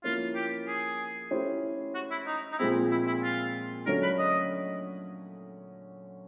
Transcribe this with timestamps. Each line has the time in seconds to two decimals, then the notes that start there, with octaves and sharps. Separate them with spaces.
0.04 F3 A#3 C#4 E4 F4
0.35 G4
0.68 G#4
1.31 A3 C#4 E4 G4 C5
1.95 F#4
2.11 E4
2.26 D#4
2.52 D#4
2.58 A#2 F3 G#3 C4 E4
2.91 E4
3.07 E4
3.23 F4
3.86 D3 F#3 A3 C#4 A#4
4.03 B4
4.18 D#5